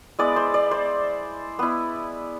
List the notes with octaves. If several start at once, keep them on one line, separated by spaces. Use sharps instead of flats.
G#3 B3 E4 D5
C5
D5
C5
B3 E4